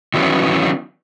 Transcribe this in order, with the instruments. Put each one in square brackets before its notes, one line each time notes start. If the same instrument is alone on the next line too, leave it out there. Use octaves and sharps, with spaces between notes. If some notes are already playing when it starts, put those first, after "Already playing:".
[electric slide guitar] D#3 E3 F#3 B3 C#4